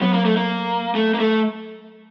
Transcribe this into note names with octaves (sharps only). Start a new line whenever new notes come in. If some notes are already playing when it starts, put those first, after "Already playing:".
F#3 B3
A#3
A3
A#3
A3
A#3
A3